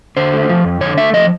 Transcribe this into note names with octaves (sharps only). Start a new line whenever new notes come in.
D3 C5
A3
F3
F2
D3 C#5
A3 E5
F3 D#5